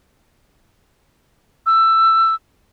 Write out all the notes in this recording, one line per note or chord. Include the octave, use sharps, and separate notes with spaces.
E6